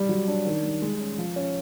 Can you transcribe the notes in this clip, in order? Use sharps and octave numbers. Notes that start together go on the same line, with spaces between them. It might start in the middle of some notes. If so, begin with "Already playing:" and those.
Already playing: G3
F#3
D4
D#3
G3
G#3
C#4
F3
C#4